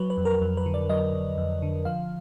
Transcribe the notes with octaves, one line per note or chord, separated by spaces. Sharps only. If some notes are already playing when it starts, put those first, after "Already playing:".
Already playing: F#3 B4
B4
F2
A#4
F2
B4
D3
D5
F#3 D#5
F2
F2
D3
F3 F5